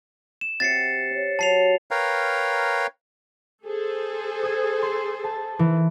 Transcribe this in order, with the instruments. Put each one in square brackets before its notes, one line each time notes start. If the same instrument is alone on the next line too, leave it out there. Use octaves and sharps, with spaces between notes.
[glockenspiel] E7
[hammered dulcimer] C3 F#5 D6 [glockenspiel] A6 C7 C#7
[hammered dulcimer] C#5
[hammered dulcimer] F#3 [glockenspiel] A5 C7 F7
[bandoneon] A#4 B4 C#5 F5 G5 A#5
[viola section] G#4 A4 C5
[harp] D#6 G#6
C6
A5
E3